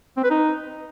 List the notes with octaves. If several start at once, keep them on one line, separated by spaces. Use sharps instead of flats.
C4
B4
D#4